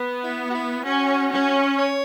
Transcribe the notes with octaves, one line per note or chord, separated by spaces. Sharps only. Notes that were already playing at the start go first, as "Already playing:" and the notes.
Already playing: B3
E4
F#4
E4
C#4 F#4
C#4
C#5